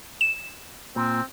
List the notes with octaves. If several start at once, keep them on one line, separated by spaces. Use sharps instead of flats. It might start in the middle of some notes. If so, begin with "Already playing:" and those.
E7
A#2 C4